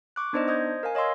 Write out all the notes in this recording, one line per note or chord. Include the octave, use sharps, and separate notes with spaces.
C#6 D6 F#6
B3 D4 D#4 C5 D5 D#5
C5 D#5 D#6 G6 G#6
A#4 F5 G#5
C#5 D#5 F5 C6 E6